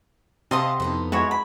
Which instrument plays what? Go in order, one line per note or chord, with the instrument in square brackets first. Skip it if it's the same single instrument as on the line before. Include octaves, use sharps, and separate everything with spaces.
[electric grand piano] C3 [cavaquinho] D#5 C6 D#6 [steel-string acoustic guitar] F5 F#5 A5
[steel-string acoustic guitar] F2 B3 D#4
[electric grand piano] G#3 [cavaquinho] E4 F#4 C#5
[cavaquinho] B5